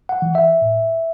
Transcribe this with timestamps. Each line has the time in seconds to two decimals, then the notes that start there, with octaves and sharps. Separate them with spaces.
0.09 F#5
0.22 E3
0.35 E5
0.62 A2